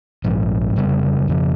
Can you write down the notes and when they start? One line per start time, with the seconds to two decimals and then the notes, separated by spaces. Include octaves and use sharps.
0.24 A#1 G#2 F3
0.76 F1 F2 C#3 G3
1.28 F2 C#3 F3